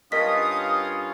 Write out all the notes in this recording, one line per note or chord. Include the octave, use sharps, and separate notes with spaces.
G2 C#4 F4 A#4 D#5 D#6 B6